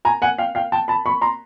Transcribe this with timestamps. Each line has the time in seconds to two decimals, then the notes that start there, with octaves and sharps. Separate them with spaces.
0.05 G#5 A#5
0.22 F#5 G#5
0.38 F5 G5
0.55 F5 G5
0.72 G5 A5
0.88 A5 B5
1.06 B5 C#6
1.21 A#5 C6